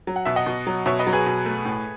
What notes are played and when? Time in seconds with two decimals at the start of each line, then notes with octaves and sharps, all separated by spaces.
0.07 F#3
0.16 F#5
0.25 B2 E5
0.36 D#5 F#5
0.46 B2
0.67 F#3
0.86 B2 C#5 E5
0.99 B4 D#5
1.07 F#3
1.13 G#4 B4
1.26 B2
1.46 A3
1.65 A2